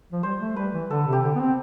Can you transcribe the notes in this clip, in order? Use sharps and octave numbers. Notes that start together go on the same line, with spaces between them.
F3
G3 C5
A3
G3 B4
E3
D3 A4
C3
G4
D3
B3
C4